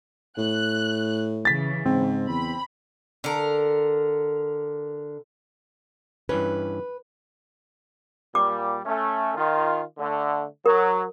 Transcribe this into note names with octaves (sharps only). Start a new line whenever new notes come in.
A2 F#6
C#3 E3 A6 B6
G#2 C4
E2 B5
D3 A#4
G2 E3 C#4 B4
A#2 G3 D6
A3 C#4
D#3 F4
D3 A3
F#3 A#4